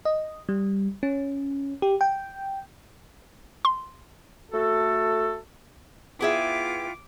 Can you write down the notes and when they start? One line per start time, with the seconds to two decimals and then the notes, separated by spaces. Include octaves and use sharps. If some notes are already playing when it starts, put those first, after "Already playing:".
0.05 D#5
0.49 G3
1.03 C#4
1.82 G4
2.01 G5
3.65 C6
4.52 A3 F#4 A4
6.21 B3 E4 F4 G#4 E5 G5 D6